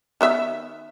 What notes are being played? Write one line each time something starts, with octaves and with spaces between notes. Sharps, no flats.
D#3 B3 E5